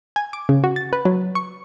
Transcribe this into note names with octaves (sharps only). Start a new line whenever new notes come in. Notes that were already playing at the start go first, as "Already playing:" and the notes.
G#5
D6
C#3
F#4
A6
B4
F#3
C#6